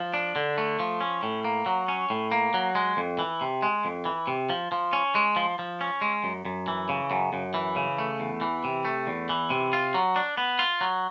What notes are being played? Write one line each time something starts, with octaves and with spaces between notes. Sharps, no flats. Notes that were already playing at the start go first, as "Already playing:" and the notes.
Already playing: F3
D4
D3
A3
F3
C#4
A2
A#3
F#3
C#4
A2
A#3
F#3
G#3
F2
E3
C3
G#3
F2
E3
C3
F3
F3
C#4
G#3
F3
F3
C#4
G#3
F#2
F#2
E3
C#3
F#2
F#2
E3
C#3
A3
E2
E3
C3
A3
E2
E3
C3
F4
F#3
D4
B3
F4
F#3